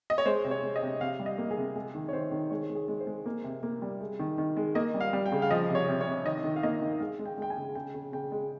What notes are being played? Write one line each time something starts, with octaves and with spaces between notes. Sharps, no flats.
D#5
C#5
G#3 C5
C3
C#5
G#3
D#5
C3
C3 F5
G3
D#5
A#3
G#4
C3
G#3 G#4
D#3
C#5
D#3 C5
D#3
G#3 C#5
G#3
G#4
G#3
C5
G#3
A#3
C3
A#3
G3
G#3
D#3
D#3
G#3
A#3 D#5
G3
F5
G3
G5
C#3
F5
F3 D#5
C3
C#5
C3
C#5
C3
D#3 D#5
D#3
F5
A#3 D#5
D#3
G#3 F5
G#3
G5
G#3 G5
G#5
C#3
C#3 G5
C#3
C#3 G5
G#3